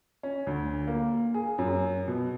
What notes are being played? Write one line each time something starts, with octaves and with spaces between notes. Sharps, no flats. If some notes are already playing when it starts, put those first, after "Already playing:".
C#4
D2
A#3
G#4
F#2
B2